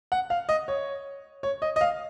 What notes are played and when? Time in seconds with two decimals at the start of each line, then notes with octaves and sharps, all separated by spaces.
0.12 F#5
0.30 F5
0.49 D#5
0.68 C#5
1.43 C#5
1.62 D#5
1.76 D#5
1.81 F5